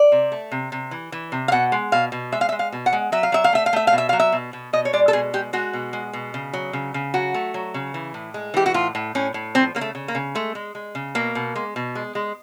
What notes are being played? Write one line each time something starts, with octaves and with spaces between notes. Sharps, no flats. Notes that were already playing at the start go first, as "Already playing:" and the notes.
Already playing: D5
C3
A3
C3
C3
E3
E3
C3
F5
B2 F#5
G#3
B2 F5
B2
G#3 E5
F5
E5
G#3
F5
B2
F#5
G#3
F#3 E5
F5
F#3 E5
F5
A3 E5
F5
A3 E5
F5
B2
E5
F#3 F5
E5
B2
B2
B2 D#5
C#5
G#3 D5
A4
B2 G#4
G#3 G4
G#3 F#4
B2
G#3
B2
C#3
F#3
C#3
C#3
F#3 F#4
A3
F#3
C#3
E3
A2
G#3
E3 G4
F#4
A2 F4
A2
A2 C#4
A2
F3 C4
C#3 A#3
A3
C#3
A#3
C#3
G#3 A3
G#3
G#3
C#3
B2 A#3
B2
G#3
B2
G#3
G#3